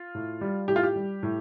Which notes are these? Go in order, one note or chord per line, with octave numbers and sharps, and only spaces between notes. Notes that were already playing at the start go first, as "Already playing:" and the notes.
Already playing: F4
A2
G3
A2 G4
F4
G4
G3
A2